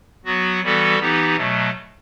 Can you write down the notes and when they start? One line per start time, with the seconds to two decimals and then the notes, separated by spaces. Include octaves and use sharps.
0.25 F#3 B3 F#4
0.62 E3 G3 B3 F#4 A4
0.99 E3 B3 D#4 G4
1.36 B2 F#3 A3